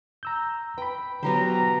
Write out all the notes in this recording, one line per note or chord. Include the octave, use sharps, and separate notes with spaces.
A#5 E6 G6
B4 G5 B5
B2 D3 F#3 G4 C5 A#5